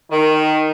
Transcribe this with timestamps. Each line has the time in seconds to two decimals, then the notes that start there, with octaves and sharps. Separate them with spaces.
0.10 D#3